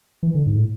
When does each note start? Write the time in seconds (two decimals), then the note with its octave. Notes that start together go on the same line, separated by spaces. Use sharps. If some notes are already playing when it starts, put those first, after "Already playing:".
0.23 E3
0.35 D3
0.46 G#2
0.57 A2